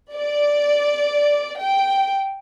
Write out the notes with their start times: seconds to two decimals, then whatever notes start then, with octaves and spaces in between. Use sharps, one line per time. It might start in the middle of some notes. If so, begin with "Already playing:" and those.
0.13 D5
1.59 G5